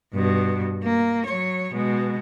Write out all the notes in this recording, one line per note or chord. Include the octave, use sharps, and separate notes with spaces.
G2 B2
A#3
F#3 C#5
B2 G#3